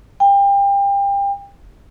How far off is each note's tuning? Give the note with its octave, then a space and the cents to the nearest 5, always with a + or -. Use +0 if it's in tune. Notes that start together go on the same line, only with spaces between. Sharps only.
G5 +30